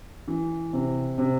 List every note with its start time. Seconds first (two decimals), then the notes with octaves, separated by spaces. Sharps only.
0.28 E3
0.73 C3
1.18 C3